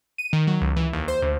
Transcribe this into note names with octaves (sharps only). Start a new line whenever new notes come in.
D#7
D#3
F#3
C#2
E3
D#2
C5
D2